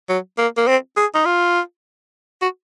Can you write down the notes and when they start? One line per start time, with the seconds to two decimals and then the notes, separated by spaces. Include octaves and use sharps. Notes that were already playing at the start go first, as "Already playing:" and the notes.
0.09 F#3
0.38 A#3
0.57 A#3
0.68 C4
0.97 G#4
1.15 D#4
1.26 F4
2.42 F#4